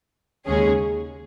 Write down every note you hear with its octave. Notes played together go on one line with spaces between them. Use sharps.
D#2 C#3 G#3 C#4 G#4